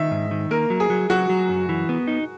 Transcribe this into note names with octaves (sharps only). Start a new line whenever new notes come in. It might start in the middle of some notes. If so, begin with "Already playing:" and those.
Already playing: D#3 D#5 E5
G#2
D#3
A#3 A#4
F#3
G#4
F#3
F#3 F#4
F#3
F#2
E3
B3
D#4